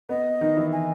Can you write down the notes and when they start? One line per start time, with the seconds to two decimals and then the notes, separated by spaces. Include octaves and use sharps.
0.09 B3 D#5
0.41 D#3 D#4
0.57 E3 E4
0.72 G#5